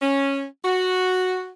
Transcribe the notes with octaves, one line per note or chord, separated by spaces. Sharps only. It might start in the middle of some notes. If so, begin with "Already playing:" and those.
C#4
F#4